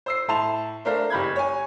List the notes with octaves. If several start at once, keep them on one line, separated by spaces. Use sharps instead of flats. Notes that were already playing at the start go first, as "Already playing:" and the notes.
C5 E6 C7
A2 E4 A5 C6 F7
A3 D4 A#4 C5 F5
F#1 G4 B5 G6 G#6
C#5 G#5